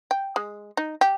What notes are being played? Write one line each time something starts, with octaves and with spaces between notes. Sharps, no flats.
G5
G#3
D#4
G4